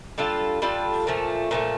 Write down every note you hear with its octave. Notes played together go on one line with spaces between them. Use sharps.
G3 D4 F4 A4
G3 D4 F4 A4
A#2 F3 A3
A#2 F3 A3